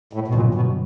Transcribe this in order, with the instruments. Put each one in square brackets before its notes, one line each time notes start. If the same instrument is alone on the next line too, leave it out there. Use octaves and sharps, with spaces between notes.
[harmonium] A2
B2
[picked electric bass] G2 D3 F#3 [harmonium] A#2
[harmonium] B2